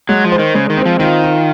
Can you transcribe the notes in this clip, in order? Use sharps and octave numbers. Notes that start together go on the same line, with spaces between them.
F#3 G#3
F3
C5
D#3
C#3 G#3
D#3
C4
F3
D#3 F4
F4